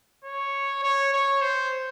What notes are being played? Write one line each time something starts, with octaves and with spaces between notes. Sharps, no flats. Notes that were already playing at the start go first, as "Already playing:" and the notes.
C#5
C#5
C#5
C5